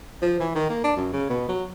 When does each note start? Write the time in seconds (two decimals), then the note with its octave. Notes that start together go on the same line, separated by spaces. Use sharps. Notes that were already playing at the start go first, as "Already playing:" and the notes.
0.22 F3
0.40 E3
0.55 D#3
0.70 A#3
0.84 D4
0.97 F#2
1.13 C#3
1.30 B2
1.48 F#3